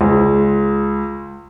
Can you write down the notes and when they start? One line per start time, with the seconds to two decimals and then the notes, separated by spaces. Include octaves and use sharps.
0.01 C#2